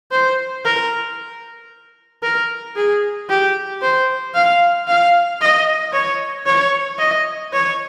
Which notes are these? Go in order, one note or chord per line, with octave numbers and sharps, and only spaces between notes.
C5
A#4
A#4
G#4
G4
C5
F5
F5
D#5
C#5
C#5
D#5
C#5